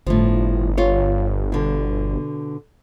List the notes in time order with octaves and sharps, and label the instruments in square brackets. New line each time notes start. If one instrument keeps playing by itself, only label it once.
[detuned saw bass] G1 [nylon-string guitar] A2 F3
[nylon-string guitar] F4 C#5
B2 D3